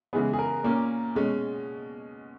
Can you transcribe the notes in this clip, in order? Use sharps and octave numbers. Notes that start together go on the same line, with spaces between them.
C#3 E3 G#3 B3 G#4
G#4
A#4
A#2 A#3 C#4
B2 G#3 C#4